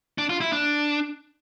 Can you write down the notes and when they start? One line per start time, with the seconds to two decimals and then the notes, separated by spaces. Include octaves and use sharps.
0.18 D4
0.29 F4
0.41 E4
0.52 D4